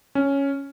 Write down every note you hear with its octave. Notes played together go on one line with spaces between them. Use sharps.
C#4